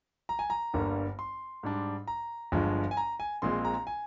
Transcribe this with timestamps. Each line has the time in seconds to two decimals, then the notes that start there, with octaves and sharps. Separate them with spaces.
0.29 A#5
0.39 G#5
0.50 A#5
0.73 G1 G2 D3 G3 A#3
1.19 C6
1.63 G#2 G3 D4
2.08 A#5
2.52 G1 G2 F3 G#3
2.91 G#5
2.97 A#5
3.20 G#5
3.42 A#1 A#2 G#3 C4 C6
3.65 A#5
3.87 G#5